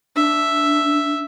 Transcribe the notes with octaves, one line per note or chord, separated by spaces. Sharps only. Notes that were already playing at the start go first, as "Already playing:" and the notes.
D4 E5